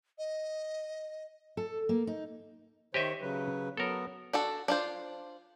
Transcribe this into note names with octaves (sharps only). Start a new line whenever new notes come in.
D#5
A4
A#3
D#4
D#3 G4 C5 C#5 D#5 E5
C#3 F#3 B4
F#3 B3 A4 A#4
D4 F#4 A4
D4 F4 C5